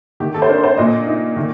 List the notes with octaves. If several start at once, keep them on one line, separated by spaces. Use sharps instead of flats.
D#3 G4
A4
C5
D4 A#4
C5
A#2 D#5
D#4
D#3